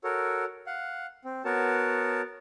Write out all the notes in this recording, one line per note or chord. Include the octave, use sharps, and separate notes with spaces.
F#4 A4 A#4 C#5
F5 F#5
C4
B3 F#4 A#4 C#5 A5